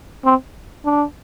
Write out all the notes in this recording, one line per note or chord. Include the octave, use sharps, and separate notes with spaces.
C4
D4